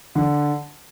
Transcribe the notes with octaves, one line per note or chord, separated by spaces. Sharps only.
D3